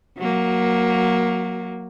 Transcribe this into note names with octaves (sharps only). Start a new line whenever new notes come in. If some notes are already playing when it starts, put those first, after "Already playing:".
F#3 A#3